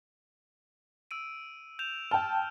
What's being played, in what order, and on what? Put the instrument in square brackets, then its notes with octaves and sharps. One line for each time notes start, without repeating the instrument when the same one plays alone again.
[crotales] E6 D7 D#7
G6 E7 F7
[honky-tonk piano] G5 A5 [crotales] F6